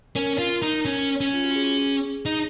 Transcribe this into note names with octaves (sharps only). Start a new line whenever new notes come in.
C#4 A#4
F4
D#4
C#4
C#4
F4
F#4
G#4
D#4